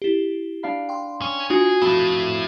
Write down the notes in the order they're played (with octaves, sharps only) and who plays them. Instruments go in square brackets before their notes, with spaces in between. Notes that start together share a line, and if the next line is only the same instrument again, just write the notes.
[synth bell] E4 G4
[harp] D4 F5 B5
[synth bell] G5 C6
[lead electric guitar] C#4
[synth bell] D4 F4 [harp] F#4 [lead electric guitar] G#4
[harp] F2 [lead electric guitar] A3 E4 [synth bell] B5 D#6